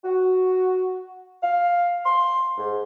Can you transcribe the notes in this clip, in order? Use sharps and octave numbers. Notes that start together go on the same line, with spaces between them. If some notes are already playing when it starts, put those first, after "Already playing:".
F#4
F5
C6
G#2